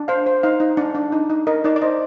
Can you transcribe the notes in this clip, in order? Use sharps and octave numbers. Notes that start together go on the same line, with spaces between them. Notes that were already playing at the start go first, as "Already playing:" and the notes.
Already playing: D4
C5 F5
C5
D#4 F5
D#4
D4
D4
D#4
D#4
A#4 D#5
D#4 D5
D5
C5 D#5